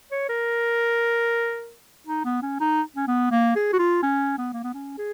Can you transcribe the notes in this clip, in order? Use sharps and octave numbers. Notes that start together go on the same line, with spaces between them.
C#5
A#4
D#4
B3
C#4
D#4
C#4
B3
A#3
G#4
F#4
F4
C#4
B3
A#3
B3
C#4
G#4